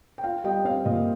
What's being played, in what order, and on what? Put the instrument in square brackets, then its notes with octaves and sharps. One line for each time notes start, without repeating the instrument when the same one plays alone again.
[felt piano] G5
F4 F5
G3 D#5 G5
C4 F5
A#2 D#5